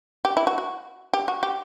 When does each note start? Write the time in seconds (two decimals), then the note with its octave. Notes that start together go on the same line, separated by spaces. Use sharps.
0.25 G4
0.37 E4
0.47 F#4
0.58 F#4
1.13 G4
1.28 F#4
1.43 G4